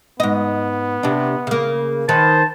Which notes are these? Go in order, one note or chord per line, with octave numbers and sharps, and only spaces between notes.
G#2 B3 D#5
C3 D4
C#3 A#3
D#3 B4 C5 A5